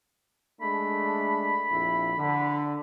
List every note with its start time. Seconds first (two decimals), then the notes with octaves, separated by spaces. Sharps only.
0.61 G#3 A3 D4 B5
1.72 A#1 F2 E4
2.18 D3